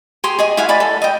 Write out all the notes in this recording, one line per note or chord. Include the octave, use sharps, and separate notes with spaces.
G4 G#4 C6
G#4 D#5 G#5
E4 F#4 F5 G#5
D5 G#5 B5 D6
A4
D#5 G5